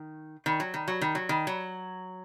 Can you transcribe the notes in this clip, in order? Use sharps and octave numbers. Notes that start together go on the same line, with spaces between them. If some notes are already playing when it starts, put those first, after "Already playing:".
Already playing: D#3
D#3
F#3
D#3
F#3
D#3
F#3
D#3
F#3